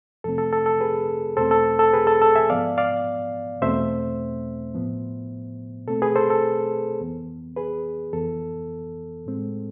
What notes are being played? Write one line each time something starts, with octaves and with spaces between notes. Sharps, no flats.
F2 C3 F3 A3 C4 A4
A4
A4
A4
G#4 B4
E2 B2 A3 C4 A4 C5
A4
A4
G#4 B4
A4
A4
E5 G#5
G#2 F3 B3 D5 F5
D5 F5
E2 B2 A3 C4 C5 E5
A2 F3 B3
B2 A3 C4 A4
G#4 B4
A4 C5
A4
F2 E3 B3
G#4 B4
F2 E3 B3 A4
A2 G#3 C4